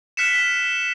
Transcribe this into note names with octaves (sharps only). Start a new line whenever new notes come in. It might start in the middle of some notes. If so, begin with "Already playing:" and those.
F6 F#6 B6 C#7 E7